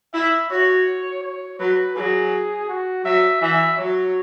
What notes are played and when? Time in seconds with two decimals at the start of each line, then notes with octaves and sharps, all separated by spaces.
0.14 E4 E5
0.50 F#4 C#5
1.23 C#5
1.60 F#3 B4
1.96 F#3 G#4
2.69 F#4
3.04 F#3 E5
3.42 E3 E5
3.77 F#3 C#5